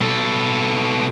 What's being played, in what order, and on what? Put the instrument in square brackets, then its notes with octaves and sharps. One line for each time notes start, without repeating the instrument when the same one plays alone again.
[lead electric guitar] B2 A4